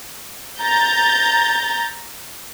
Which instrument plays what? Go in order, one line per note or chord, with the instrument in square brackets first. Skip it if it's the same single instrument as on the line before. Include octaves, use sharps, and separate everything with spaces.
[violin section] A#5 G6 A6